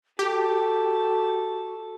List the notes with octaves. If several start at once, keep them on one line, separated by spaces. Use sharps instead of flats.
F#4 G4 A4